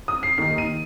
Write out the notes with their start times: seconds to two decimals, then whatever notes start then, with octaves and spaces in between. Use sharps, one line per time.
0.08 D#6
0.23 C7
0.38 D#2 D#3 A#3 D#4 C7
0.58 D#7